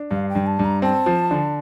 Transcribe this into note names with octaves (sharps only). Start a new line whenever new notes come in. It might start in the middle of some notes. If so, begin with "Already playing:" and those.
Already playing: D4
G2 F5
G5
G2
A5
G2
A#5
C4 A5
F3
D3